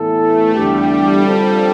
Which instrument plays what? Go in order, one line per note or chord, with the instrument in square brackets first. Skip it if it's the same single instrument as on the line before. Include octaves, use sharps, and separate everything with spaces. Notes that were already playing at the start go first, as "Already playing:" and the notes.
Already playing: [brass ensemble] A2 E3 B3 E4 A4
[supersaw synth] A3
[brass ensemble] E2 D3 A3 D4 G4 [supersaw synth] G3
[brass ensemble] D3 F3 C4 F4 A4